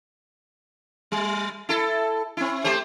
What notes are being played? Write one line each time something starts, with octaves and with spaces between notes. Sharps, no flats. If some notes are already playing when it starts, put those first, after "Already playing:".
G3
E4 A4
C4 E4
A3 G4 C5